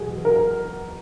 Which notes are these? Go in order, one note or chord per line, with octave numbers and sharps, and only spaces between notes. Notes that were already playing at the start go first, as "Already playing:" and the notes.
Already playing: E1 E2 B2 F#3 G#4
A#4